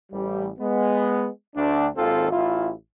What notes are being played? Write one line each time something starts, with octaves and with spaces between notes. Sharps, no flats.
A1 G3
G#3 B3
D2 D4
G#1 D#2 C4 F4 A4
A1 E4 F4